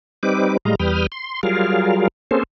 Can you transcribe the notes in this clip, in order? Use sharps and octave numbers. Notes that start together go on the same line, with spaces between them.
G3 C4 D#4 B4 D6
A2 G3 G#3 D#5 F5 A#5
E2 G3 B4 G5 D#6 F6
C6
F#3 G3 F4 G#4 A#4 F5
A#3 C4 C#4 G#4 A4 C5